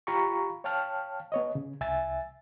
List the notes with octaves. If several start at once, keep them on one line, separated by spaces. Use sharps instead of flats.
F4 G4 F5 A#5 B5 C#6
C#5 F5 G5 A5 F6
B3 C#5 D#5
C#3
C2 E5 G#5 A6